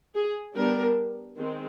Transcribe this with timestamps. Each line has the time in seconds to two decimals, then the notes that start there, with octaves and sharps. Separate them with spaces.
0.15 G#4
0.55 G3 B3 D4 A#4
1.37 D#3 G#3 C4